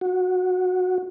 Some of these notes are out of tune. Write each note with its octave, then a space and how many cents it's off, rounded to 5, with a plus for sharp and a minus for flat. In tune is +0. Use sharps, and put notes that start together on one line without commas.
F#4 -15